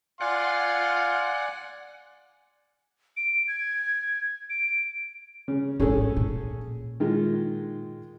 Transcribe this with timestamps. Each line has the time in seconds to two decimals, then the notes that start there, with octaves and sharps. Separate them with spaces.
0.21 D5 F5 F#5 G#5 C6
3.17 D7
3.48 G#6
4.50 D7
5.48 C#3
5.80 A1 G#2 C#4 G#4 A4
6.17 A#2
7.00 D#3 G#3 F4